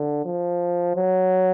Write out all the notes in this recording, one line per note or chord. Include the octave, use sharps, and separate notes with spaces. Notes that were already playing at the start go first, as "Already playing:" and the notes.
Already playing: D3
F3
F#3